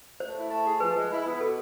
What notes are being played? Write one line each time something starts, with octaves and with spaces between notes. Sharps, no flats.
A3 C5
E4
A3
G#4
F3 B4
G#3
E4
B3
B2 A4